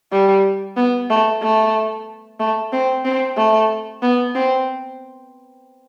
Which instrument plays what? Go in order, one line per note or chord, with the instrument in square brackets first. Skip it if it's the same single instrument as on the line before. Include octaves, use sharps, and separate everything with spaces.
[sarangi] G3
B3
A3
A3
A3
C4
C4
A3
B3
C4